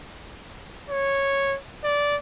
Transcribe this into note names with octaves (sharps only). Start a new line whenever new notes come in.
C#5
D5